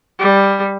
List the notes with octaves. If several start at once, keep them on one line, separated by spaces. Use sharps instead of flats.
G3